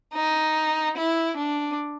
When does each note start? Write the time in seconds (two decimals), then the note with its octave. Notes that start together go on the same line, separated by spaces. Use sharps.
0.13 D#4
0.96 E4
1.37 D4